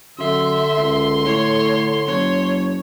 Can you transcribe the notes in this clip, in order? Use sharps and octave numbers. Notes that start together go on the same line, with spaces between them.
F#2 D3 E5 C6
C#2
A2 C#5
F#1 C#5